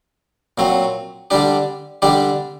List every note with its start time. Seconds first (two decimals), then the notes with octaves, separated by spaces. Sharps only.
0.58 A#2 F#3 C4
1.30 D3 G3 D4 G4
2.02 D3 G3 D4 G4